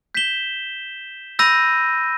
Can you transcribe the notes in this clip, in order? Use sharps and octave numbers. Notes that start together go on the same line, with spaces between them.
G6 B6 E7 G7
B5 E6 G6 A#6 D#7